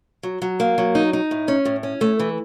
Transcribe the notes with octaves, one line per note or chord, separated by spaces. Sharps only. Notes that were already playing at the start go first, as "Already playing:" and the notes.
F#3
F#3
A#3
F#3
D#4
D#4
A2
C#4
A2
C#4
A3
E3